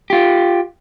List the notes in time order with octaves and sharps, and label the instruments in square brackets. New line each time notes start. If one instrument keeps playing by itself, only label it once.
[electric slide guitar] F4 G4